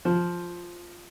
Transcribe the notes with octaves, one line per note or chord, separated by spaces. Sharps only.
F3